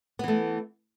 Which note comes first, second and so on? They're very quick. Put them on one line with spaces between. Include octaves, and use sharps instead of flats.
B3 E3 A3